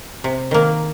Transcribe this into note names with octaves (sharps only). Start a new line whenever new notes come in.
C3
D#3 A#3